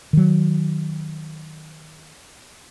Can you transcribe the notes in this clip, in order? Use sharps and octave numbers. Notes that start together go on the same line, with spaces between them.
D#3 F#3